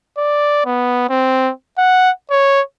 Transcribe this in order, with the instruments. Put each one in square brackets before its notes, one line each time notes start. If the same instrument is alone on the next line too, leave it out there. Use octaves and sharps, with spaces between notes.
[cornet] D5
B3
C4
F#5
C#5